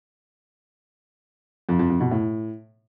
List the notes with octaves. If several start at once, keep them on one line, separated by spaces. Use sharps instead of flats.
F2
F2
F2
B2
A2